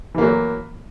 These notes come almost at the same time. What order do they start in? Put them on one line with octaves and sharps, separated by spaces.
E3 A#3 F#3